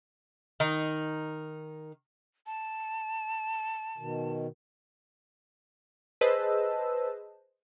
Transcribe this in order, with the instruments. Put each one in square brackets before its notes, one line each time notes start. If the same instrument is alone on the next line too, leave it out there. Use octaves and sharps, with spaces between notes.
[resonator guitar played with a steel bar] D#3 D#4
[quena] A5
[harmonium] B2 D#3
[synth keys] G#4 B4 C5 D#5 A5 E6